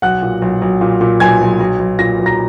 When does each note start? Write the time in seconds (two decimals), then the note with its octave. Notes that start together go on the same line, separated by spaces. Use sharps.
0.02 B1 F#5 F#6
0.22 A#2
0.42 B1
0.62 B1
0.81 A#2
1.01 A#2
1.20 B1 G#5 G#6
1.41 B1
1.60 B1
1.79 B1
1.99 A#2 A#6
2.19 B1
2.26 A#5 A#6